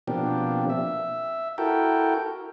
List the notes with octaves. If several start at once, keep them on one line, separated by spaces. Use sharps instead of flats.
B2 F3 A#3 C4 D4 G4
E5
E4 F#4 A4 A#4 G5